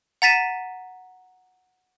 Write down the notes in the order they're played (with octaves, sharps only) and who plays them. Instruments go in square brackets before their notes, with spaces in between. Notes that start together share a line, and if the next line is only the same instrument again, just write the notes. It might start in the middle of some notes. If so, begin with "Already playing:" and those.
[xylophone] F#5 A#5 A6 B6 D#7 E7